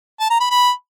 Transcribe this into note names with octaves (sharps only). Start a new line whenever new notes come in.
A5
A#5
B5
B5